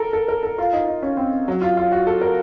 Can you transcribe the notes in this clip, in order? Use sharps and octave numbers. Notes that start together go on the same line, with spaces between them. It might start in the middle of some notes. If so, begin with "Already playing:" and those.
Already playing: A4 A#4
A4
A#4
A4
F4
D#4
D#4
C#4
C4
F#3
F4
F4
F#4
A4
A#4